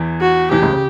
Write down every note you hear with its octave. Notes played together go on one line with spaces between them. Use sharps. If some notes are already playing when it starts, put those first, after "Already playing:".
Already playing: E2 E3
F#4
E2 E3 G4
C#2 C#3
C#3